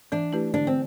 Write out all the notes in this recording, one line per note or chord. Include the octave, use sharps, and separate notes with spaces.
E3 D4
A3 E4 G4 B4
D3 D4
C4